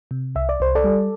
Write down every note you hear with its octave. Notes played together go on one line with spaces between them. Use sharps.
C3
C2 E5
D5
C2 C5
A4 D5
G3